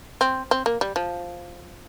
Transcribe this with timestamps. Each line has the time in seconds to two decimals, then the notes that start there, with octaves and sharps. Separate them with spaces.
0.21 C4
0.51 C4
0.66 A#3
0.81 G3
0.96 F3